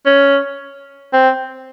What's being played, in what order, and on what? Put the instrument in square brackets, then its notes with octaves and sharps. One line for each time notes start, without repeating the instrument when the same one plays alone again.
[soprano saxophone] C#4
C4